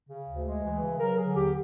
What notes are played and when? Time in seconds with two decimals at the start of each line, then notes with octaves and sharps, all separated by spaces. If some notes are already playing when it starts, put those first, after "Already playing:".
0.09 C#3
0.28 D2
0.46 G#3
0.64 E3
0.82 C#3
0.99 F#3 A#4
1.18 D3 G#4
1.35 D#2 G4